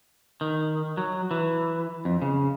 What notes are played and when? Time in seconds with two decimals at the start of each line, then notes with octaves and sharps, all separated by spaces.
0.41 D#3
0.97 F#3
1.31 E3
2.05 F2
2.22 C#3